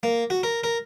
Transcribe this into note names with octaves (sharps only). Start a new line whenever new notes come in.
A#3
F#4
A#4
A#4